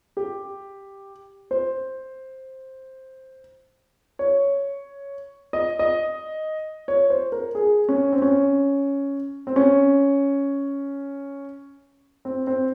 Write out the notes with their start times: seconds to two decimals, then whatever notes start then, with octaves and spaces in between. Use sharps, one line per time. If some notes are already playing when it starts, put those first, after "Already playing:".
0.17 G4
1.51 C5
4.19 C#5
5.53 D#5
5.79 D#5
6.88 C#5
7.10 C5
7.32 A#4
7.55 G#4
7.89 C#4
8.12 C4
8.22 C#4
9.47 C4
9.56 C#4
12.25 C4
12.47 C4